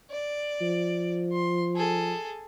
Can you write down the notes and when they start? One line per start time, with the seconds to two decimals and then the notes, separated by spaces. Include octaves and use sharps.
0.10 D5
0.61 F3
1.33 C6
1.76 G#4 A4